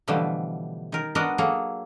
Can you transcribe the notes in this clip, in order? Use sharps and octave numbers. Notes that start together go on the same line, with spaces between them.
B2 D3 E3 F3 G3 A3
D#3 A#4
G#3 B3 D4 F#4 A#4 D#5
F#3 A#3 G#4 A4